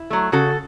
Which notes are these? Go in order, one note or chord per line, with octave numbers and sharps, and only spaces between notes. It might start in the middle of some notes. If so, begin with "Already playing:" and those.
Already playing: E4
F#3 A3
C#3 F#4 A4